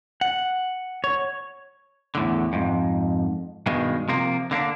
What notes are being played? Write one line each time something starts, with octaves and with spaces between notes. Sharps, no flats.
F#5
C#5
E2 A2 D3
F2 G#2
G2 B2 D#3 G#3
C3 F3 A#3
D3 A#3 C#4 D4